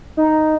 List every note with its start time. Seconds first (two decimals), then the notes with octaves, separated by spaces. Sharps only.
0.17 D#4